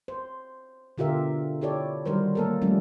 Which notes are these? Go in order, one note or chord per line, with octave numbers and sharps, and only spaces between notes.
C5
B2 D3 F4 G4 A#4 E5
E4 G4 A4 C#5 D5
D#3 F#3 G3 A#4 C5
A#3 A4 A#4
F3 G3 A3 C#4